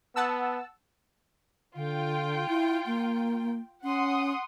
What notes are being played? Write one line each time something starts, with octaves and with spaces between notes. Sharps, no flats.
B3 F#5 A5 E6
D3 F4 G5
E4
A#3
C#4 F#5 C6 D#6